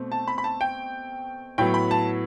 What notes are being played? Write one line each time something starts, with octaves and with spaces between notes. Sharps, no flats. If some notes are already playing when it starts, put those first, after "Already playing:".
Already playing: B2 A3 C4
A5
B5
B5
A5
G5
A2 F#3 B3 G5
B5
A5